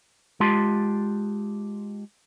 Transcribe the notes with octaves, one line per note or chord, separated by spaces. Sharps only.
G#3 F4 G4 A5 C6